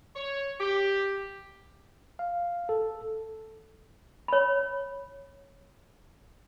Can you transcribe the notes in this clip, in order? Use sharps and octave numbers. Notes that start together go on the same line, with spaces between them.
C#5
G4
F5
A4
C#5 B5